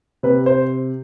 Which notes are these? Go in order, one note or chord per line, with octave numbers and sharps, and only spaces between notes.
C3 B4
C5